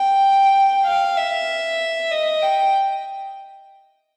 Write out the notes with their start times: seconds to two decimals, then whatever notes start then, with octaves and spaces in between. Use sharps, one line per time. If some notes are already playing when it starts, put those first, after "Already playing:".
Already playing: G5
0.85 F5
1.17 E5
2.11 D#5
2.42 G5